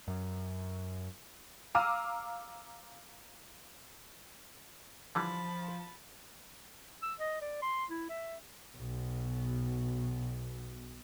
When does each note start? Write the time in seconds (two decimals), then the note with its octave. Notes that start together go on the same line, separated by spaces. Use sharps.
0.08 F#2
1.75 F5 A#5 D6 E6 F6 D#7
5.15 D3 E3 F3 G3 A5 B5
7.03 E6
7.20 D#5
7.42 D5
7.62 C6
7.90 E4
8.10 E5
8.77 B1 B2